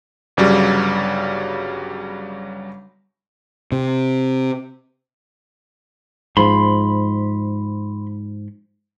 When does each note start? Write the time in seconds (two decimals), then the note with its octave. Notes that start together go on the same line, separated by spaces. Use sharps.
0.37 G1 C#3 F#3 G3
3.72 C3
6.37 G#2 F3 B5 C6